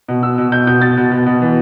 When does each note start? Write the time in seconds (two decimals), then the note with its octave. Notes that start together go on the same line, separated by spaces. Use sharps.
0.08 B2
0.23 B2 E6
0.38 B2
0.52 B2 G6
0.67 B2 G6
0.82 B2 A6
0.97 B2
1.11 B2
1.26 B2
1.42 E3